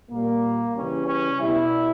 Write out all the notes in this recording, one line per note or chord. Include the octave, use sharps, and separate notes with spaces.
A#2 G3 A#3
C#3 E3 G3 C#4
C#4
B2 G3 E4